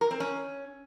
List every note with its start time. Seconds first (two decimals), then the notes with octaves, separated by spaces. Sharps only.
0.01 A#4
0.11 C4
0.20 C#4